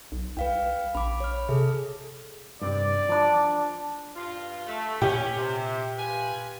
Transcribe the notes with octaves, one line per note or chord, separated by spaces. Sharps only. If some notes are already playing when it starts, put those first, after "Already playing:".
B1
C2 B4 F5 G5
A#1 B5 D6
C#5 F6
C3 G#4 A4
G2 C3 D5
F3 D4
G2 F4
A3
A#2 C#4 G4
C3
F4 B4 G#5